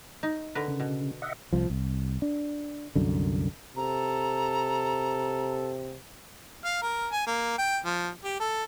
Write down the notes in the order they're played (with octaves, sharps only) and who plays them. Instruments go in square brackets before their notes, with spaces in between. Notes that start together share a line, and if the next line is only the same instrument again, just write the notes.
[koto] D#4
D3 A#4 B4
[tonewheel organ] C#3
[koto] B2
[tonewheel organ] D#5 E5 F#5
[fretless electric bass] C2 F3
C2
D4
C2 F#2 D3
[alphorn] C3 [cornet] A4 [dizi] A#5
[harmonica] F5
A#4
G#5
A#3
G5
F3
G4
A4